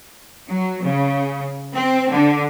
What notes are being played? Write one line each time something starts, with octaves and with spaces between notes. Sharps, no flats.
F#3
C#3
C4
D3